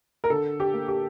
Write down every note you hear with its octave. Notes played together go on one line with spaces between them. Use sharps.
A#4
D3 A4
G4
A#3
G4